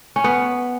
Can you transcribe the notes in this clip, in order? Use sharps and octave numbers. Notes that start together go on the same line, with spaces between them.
C#4
B3